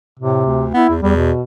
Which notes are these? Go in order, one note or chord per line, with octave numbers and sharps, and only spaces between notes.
A2 C3
D2
B3 E4
E2
E2 G3
B2